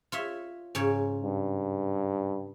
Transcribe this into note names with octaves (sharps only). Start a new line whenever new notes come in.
F4 C#5 E5
G#2 C#3 C#5
G2